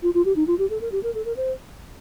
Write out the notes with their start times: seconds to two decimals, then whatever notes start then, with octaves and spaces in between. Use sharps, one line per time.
0.03 F4
0.14 F4
0.25 G4
0.36 D#4
0.47 F4
0.59 G4
0.70 A4
0.81 A#4
0.92 G4
1.03 A#4
1.15 A4
1.25 A#4
1.37 C5